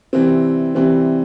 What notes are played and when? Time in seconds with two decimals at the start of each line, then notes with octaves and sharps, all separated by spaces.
0.13 C3 E3 G3 C4
0.75 C3 E3 G3 C4